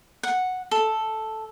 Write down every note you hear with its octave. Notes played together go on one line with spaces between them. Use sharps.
F#5
A4